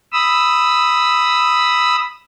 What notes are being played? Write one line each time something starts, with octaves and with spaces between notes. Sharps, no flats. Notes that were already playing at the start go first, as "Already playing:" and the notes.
B5 D#6 E6